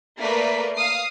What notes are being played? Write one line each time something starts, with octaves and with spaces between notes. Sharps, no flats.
A3 A#3 A#4 B4 D5 B6
F5 D#6 C7